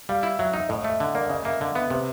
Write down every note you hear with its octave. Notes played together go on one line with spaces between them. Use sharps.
G3 F5
E4
F#3 E5
D#4 E5
A2 D#5
E5
A3
E5
D3
A#3 D5
D5
C#3 D#5
A#3 E5
D3 F5
B3 E5
C3 B4